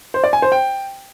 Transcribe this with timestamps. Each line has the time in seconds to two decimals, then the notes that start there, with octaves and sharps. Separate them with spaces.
0.14 C5
0.24 D5
0.33 G#5
0.42 C5
0.52 G5